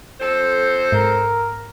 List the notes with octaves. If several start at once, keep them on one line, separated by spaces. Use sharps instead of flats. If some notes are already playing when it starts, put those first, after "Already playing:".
F2 A4 C5
G#2 A#4